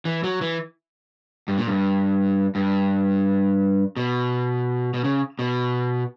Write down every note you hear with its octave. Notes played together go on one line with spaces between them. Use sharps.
E3
F#3
E3
G2
A#2
G2
G2
B2
B2
C#3
B2